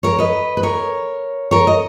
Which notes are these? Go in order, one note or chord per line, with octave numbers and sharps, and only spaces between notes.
A#4 C#5
B4 D#5
B4
A#4 C#5
A#4 C#5
D#5